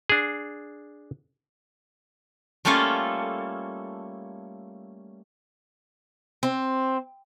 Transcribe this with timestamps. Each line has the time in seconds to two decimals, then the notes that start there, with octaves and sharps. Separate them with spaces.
0.10 D4 G#4
2.65 G3 A3 A#3 C#4 F4 A4
6.43 C4